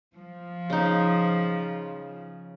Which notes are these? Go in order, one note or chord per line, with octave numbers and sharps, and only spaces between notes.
F3
C#3 D#4